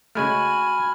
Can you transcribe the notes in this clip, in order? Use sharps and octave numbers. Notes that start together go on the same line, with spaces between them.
C#3 G#3 A3 F#4 G#5 B5 F6